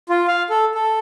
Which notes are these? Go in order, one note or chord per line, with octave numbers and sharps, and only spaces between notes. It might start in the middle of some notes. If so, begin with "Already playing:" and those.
F4
F5
A4
A4